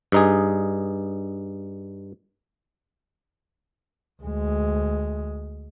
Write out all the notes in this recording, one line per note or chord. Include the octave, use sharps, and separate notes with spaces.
G2 D#4 G#4
D2 G#3